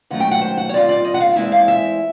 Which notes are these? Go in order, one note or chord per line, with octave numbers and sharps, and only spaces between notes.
G#2 D#3 F#3 A3 C#4 F#5
G5
F#5
C5
F#5
C#5
D#3 G3 C4 F4 D5
D5
D#5
F#5
F5
E2 B2 G#3 C4 E4 E5
F5
E5